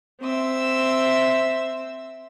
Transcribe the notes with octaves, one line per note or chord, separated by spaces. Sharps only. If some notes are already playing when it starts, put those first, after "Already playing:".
C4 E5 E6